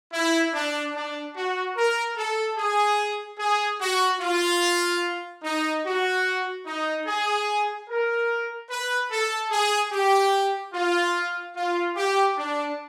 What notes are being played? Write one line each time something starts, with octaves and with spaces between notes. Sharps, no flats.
E4
D4
D4
F#4
A#4
A4
G#4
G#4
F#4
F4
D#4
F#4
D#4
G#4
A#4
B4
A4
G#4
G4
F4
F4
G4
D4